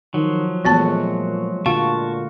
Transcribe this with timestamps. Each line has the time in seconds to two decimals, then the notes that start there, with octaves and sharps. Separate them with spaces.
0.14 D#3 F3 F#3
0.65 A#2 E3 G#3 A3 B3 F#4 A5
1.66 A#2 D3 F4 F#4 F5 A5 C#6